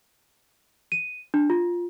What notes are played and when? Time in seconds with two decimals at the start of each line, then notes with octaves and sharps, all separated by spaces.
0.92 D#7
1.34 D4
1.50 F4